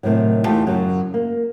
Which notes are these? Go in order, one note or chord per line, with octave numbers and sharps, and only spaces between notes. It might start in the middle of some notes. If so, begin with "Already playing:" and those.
A2 C3 D#3 F#3
E2 A3 D#4 F4 G4 A5
F#2 C#3 F#3
A#3